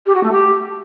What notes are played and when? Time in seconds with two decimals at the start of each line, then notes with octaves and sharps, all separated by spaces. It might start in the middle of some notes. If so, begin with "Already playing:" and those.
0.06 G4
0.14 F#4
0.23 A3
0.31 G4